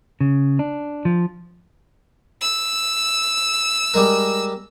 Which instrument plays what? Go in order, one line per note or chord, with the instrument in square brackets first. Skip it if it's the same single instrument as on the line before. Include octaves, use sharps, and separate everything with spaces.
[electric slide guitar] C#3
D4
F3
[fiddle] E6
[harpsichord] G3 G#3 A#4